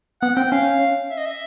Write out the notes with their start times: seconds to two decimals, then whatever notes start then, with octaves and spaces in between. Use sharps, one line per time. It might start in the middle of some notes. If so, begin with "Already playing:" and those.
0.22 B3 F#5
0.36 C4 G5
0.52 C#4 F5
1.11 E5
1.18 D#5
1.25 E5